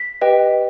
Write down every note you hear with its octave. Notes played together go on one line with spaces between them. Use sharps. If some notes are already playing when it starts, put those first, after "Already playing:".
Already playing: B6
G4 B4 D#5 G5